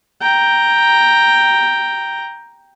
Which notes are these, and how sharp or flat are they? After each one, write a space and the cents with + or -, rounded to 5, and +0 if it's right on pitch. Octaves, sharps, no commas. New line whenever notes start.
G5 +0 A#5 +0